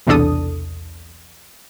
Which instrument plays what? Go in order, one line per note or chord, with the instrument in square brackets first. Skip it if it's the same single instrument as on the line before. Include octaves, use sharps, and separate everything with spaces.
[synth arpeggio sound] B1 E2 C3 D4 A4 D#6